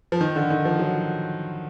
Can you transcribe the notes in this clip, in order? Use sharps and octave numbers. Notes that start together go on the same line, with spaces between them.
F3
D#3
D3
D#3
F3
F#3